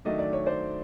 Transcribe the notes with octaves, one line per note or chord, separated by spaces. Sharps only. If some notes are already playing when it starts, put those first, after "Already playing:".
D#3 F#3 A3 D4 D#5
D5
C#5
C5 D5